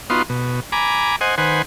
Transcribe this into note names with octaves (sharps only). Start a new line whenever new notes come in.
B3 D#4 F4 F#4 C6
B2
G#5 A#5 B5 D6
C5 D#5 F#5 G#5
D#3 B4 C5 F#5 G#5